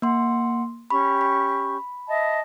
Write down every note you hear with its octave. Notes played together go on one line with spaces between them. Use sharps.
A#3 F#5 C6
C#4 G4 B5 C#6
B5
D#5 E5 A5